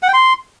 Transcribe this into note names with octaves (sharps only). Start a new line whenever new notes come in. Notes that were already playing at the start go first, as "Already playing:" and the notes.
F#5
G5
C6